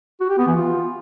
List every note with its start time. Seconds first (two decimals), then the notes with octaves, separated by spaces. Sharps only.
0.20 F#4
0.29 G4
0.38 B3
0.47 E3
0.56 F4